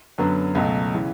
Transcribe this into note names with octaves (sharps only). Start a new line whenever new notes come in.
F#2 D3 F#3 B3
C#2 B2 F#3 A3
C#3 E3